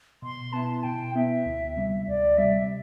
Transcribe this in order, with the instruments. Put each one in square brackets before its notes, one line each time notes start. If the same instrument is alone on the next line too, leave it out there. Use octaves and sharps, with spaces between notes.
[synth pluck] B2 [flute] C6
[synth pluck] B3 E4 [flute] A5
[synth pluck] B2 [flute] G5
[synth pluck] B3 E4 [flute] E5
[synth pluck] D2
C3 G3
[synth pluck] D2 [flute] D5
[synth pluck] C3 G3 [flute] E5